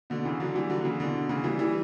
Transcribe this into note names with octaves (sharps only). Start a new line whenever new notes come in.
B2 D3
C#3 E3
D3 F#3
E3 G3
D3 F#3
D3
C#3 E3
B2 D3
C#3 E3
E3 G3
E3 G3